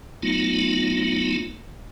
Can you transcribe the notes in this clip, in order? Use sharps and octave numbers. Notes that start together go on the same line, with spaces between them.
F#3 A3 B3 D#4 F4